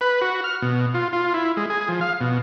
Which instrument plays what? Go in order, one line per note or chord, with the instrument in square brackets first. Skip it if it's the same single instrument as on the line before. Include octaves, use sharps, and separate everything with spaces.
[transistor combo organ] B4
F#4
F6
B2
F4
F4
E4
G#3
G#4
F3
F5
B2